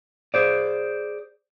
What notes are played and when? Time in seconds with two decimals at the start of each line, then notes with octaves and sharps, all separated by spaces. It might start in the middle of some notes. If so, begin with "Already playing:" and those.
0.34 G#4 C5 D5